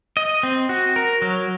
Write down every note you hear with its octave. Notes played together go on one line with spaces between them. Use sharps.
D#5
C4
F#4
A#4
F#3